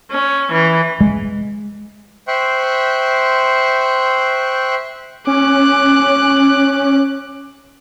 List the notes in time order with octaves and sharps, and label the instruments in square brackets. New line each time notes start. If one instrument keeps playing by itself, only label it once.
[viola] C#4
E3
[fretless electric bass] G#3
[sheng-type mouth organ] C5 E5 G5 C6 C#6 F#6
[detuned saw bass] C#4 [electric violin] D6 F#6